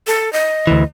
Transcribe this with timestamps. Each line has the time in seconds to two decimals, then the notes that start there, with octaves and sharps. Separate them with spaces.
0.07 A4
0.33 D#5
0.67 D2 E3